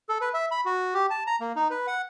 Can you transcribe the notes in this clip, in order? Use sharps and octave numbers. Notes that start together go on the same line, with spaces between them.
A4
B4
E5
B5
F#4
G4
A5
A#5
A#3
D#4
B4
F#5